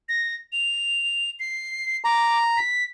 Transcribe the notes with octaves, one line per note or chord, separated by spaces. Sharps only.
A#6
F7
C7
A#5 D6
B6